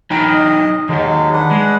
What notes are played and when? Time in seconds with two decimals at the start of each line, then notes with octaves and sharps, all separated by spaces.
0.10 F#3 D#4 G5 A#5 B5
0.28 D#5
0.89 D#3 F#3 G#3 G4
1.33 D4 B4 F#5
1.51 G#3